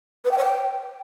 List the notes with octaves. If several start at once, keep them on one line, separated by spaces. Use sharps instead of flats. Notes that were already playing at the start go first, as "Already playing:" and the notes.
B4
G5
C#5
G5